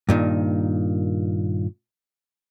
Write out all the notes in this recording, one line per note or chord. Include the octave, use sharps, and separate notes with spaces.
G2 A#2 D#3